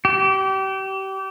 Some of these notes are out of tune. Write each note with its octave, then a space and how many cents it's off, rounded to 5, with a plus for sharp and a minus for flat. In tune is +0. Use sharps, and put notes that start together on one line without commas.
G4 -30